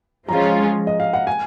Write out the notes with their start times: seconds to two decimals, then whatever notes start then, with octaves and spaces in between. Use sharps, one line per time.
0.28 F3 G#3 C#4 F4 A#5
0.87 D#5
1.00 F5
1.13 F#5
1.27 G#5